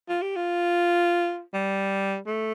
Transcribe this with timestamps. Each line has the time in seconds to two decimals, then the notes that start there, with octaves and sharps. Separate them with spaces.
0.09 F4
0.22 G4
0.36 F4
1.54 G3
2.26 A3